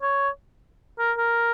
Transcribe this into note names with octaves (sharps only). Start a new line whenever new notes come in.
C#5
A#4
A#4